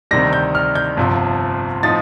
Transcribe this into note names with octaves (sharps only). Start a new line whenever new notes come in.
D2 C3 D#3 G3 A#6
G6
F6
G6
G1 F2 C3 F3
A2 F3 C4 D#4 A6